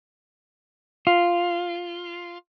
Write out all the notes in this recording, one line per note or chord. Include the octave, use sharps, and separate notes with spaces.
F4